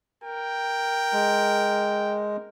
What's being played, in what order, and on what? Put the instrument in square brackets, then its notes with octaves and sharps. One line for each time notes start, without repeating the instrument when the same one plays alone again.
[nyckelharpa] A#4 [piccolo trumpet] G5
[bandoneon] G#3